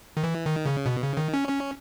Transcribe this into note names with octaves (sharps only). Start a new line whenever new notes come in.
D#3
E3
D#3
C#3
B2
C#3
D#3
C#4
C#4